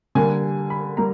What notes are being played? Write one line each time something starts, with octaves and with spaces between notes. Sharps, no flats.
D3 G3 A#3 G#5
B5
G3 A#3 A#5